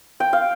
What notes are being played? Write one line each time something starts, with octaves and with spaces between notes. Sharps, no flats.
G5
F5